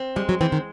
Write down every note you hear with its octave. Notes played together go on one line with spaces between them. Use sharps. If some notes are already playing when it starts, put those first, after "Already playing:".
Already playing: C4
G3 G#3
F#3
E3 C4
D#3